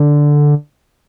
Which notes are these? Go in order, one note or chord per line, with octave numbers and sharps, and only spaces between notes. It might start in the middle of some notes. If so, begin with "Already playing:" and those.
Already playing: D3